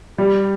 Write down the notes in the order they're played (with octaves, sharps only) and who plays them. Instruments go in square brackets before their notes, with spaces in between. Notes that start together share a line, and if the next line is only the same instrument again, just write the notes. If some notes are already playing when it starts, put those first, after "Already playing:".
[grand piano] G3 [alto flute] G4